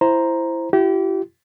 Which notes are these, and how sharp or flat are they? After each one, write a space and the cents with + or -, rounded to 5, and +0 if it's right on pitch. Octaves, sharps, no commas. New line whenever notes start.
E4 +15 C5 +0 A#5 +0
E4 +40 G4 -35